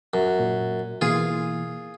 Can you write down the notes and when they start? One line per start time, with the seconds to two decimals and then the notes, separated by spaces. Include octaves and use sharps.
0.14 F#2
0.39 A#2
1.01 B2 E3 A#3 F4 G#4